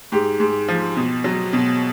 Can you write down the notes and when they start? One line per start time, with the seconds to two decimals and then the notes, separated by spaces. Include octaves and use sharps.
0.12 G#2 G4
0.40 G#2
0.68 F3
0.97 B2
1.24 F#3
1.53 B2